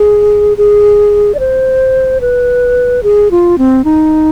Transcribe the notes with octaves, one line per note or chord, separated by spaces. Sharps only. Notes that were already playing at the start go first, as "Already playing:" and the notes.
Already playing: G#4
G#4
D5
C5
B4
G#4
F4
C4
D#4